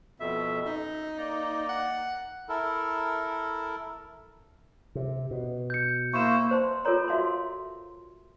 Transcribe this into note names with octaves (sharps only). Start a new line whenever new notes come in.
F2 B2 E5
F#2 D#4
A#3 D5 A#5
F#5
E4 A4 A#4
C3
B2
G6 C#7
A#3 E4 C5 C#6 E7
C5 A5 C6
F4 A4 A#4 C#5 A#5
F#4 E5 F5 A5 C6